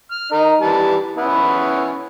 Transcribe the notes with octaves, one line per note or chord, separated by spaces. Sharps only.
F6
D#4 A#4
E3 G3 A5
B3 C#4 E4